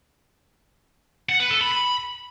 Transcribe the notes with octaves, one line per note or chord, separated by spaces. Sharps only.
F#5
B4
A4
B5
B5